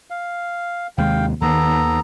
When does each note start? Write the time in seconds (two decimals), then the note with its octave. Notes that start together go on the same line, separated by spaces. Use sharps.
0.10 F5
0.98 D#2 C3 G#3 F5 G5
1.41 D#2 D#3 B3 A4 A#5